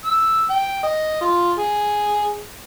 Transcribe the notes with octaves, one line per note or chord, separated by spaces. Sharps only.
E6
G5
D#5
F4
G#4